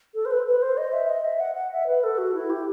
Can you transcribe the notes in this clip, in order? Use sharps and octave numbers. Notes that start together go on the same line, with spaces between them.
A4
C5
B4
B4
C5
D#5
E5
D#5
E5
F#5
F#5
E5
B4
A4
F#4
E4
G4